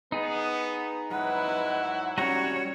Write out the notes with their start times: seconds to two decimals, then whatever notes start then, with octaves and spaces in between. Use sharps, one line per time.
0.12 B3 D#4 G#4
1.11 G#2 F#3 E4 B4 F#5
2.18 G3 C#4 F#4 C#5 A#5